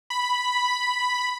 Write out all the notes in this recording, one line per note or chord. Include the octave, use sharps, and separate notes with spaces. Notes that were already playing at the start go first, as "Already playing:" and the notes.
B5